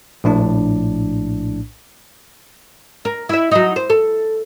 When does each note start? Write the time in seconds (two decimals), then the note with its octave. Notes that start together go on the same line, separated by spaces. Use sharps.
0.24 A#1 A2 D4
3.05 A#4
3.29 E4 E5
3.51 F#3 D#4
3.76 C5
3.90 A4